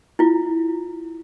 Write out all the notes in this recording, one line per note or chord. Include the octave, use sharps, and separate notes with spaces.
E4 F4